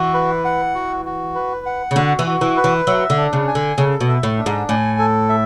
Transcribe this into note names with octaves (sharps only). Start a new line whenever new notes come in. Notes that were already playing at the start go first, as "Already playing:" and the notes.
Already playing: E3 F#4
B4
F#5
F#4
F#4
B4
F#5
C#3
D3 F#4
E3
F#4
E3
B4
E3
F#3 E5
D3
D4
C#3
G#5
D3
C#3 A4
B2
E5
A2
D4
G#2
A2 G#5
A4
E5